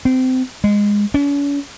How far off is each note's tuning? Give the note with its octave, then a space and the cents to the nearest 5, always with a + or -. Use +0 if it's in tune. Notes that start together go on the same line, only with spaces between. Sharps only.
C4 -25
G#3 -15
C#4 +45